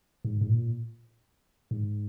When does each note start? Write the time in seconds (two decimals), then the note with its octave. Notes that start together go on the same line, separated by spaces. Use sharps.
0.25 G#2
0.41 G#2
0.49 A#2
1.71 G#2